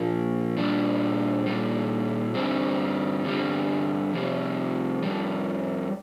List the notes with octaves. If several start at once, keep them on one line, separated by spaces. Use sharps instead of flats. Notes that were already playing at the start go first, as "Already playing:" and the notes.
Already playing: A#2 F3 F4
A#2 G3 D4
A#2 G3
G2 D3 G3 C4
G2 D3 G3
F2 C3 G3
F2 C3 G3